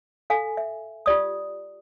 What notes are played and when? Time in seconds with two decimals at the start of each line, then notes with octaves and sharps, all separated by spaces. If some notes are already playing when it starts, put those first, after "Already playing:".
0.30 A4 F5 G#5
0.57 E5
1.06 F4 G4 D5 D#6